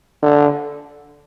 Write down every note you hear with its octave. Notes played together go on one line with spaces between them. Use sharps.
D3